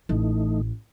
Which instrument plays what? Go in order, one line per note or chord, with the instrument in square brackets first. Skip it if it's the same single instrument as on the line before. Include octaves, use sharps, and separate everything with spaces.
[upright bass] A1 [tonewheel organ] E3 A3 D#4